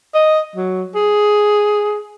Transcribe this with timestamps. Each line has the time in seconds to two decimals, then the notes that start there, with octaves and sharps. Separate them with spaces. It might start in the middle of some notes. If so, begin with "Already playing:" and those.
0.14 D#5
0.56 F#3
0.95 G#4